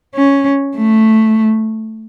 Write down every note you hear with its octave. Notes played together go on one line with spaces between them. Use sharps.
C#4
A3